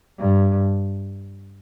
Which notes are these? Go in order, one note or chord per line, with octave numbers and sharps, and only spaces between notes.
G2